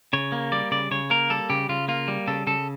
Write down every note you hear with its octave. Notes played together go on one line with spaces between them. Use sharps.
C#3 C#5
A#3
G3 D5
C#3 D5
C#3 C#5
A#3 A#4
G3 A4
C#3 G4
C#3 F4
A#3 F4
G3
C#3 A4
C#3 A4